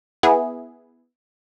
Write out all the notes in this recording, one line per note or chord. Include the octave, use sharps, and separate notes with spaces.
B3 E4 G#4